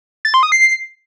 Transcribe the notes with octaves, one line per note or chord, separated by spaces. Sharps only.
A6
C6
D#6
C7